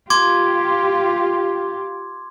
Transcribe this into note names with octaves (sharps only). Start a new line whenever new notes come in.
F4 G4 C6 D6 G#6